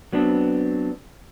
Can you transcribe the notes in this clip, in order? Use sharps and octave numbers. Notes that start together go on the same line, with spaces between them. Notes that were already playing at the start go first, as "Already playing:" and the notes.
F#3 B3 C4 D4